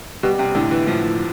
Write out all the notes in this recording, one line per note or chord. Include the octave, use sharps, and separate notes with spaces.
B2 G3
C3
A2 D3
E3
A2 F3